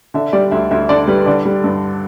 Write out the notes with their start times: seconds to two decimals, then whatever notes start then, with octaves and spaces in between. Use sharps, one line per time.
0.14 D3 E5
0.33 G3 D5
0.51 D2 E5
0.71 D2 E5
0.89 D3 D5
1.07 G3 B4
1.26 D3 D5
1.45 G3
1.64 G2